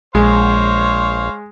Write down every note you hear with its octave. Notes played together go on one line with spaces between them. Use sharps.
A#1 G#3 C5 C#5 F5